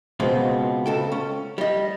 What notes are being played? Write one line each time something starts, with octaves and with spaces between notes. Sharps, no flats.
C#2 B2 G#3 B3 C4
C#2 A4 G5
C#4
G3 D#5